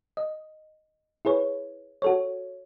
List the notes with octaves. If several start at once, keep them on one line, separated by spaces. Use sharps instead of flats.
D#5
E4 G#4 B4 C#5
F#4 A4 C#5